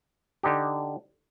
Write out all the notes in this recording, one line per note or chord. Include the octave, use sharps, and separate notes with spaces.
D3 D#4 G4